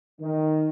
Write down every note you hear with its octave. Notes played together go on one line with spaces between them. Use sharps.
D#3